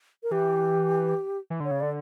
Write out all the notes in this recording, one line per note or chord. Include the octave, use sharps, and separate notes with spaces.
A#4
E3 G4
E3
D3 C#5
C#3
D3 D5